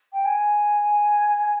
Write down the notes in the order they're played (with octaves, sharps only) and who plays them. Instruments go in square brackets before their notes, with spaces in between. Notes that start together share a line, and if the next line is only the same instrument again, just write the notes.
[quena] G5
G#5